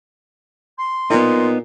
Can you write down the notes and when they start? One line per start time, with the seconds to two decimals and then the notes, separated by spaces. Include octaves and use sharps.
0.78 C6
1.10 A#2 B3 D#4